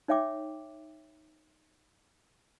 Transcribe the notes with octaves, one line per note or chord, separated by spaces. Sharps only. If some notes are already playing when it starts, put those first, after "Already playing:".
D#4 C#5 E5 G5 D6